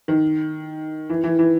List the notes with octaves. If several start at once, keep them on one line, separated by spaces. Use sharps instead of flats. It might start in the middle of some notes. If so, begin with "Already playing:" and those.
D#3
E3
E3
E3